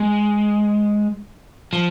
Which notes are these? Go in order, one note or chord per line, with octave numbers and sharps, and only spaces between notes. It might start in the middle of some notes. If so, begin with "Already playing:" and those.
Already playing: G#3
F3